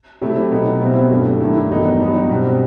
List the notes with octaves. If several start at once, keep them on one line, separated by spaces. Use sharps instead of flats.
C3 F#3 A3 E4
B2 F#3 B3 D#4
B2 G3 C4 E4
G2 F#3 A3
G2 D#3 A3 E4
E2 D#3 F#3 B3 D#4
G2 F#3 B3 D#4
B2 G3 C4